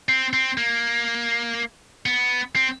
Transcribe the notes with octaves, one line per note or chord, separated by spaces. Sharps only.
C4
C4
A#3
B3
C4